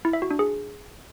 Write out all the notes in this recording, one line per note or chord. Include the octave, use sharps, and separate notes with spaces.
E4
E5
F#4
D4
G#4